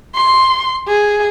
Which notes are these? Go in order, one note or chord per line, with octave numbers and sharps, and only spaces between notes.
C6
G#4